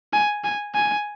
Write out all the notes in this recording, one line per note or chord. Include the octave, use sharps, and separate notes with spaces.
G#5
G#5
G#5